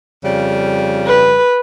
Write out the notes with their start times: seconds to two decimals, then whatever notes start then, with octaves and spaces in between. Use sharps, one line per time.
0.24 F2 C#3 G3
1.07 B4